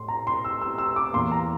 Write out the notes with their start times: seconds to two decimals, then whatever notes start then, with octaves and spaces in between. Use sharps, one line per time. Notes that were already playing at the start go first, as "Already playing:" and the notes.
Already playing: A2 C6
0.08 A#5
0.27 C6
0.44 E6
0.62 E6
0.78 E6
0.96 D6
1.13 E2 E3 A#3 C6
1.32 A#5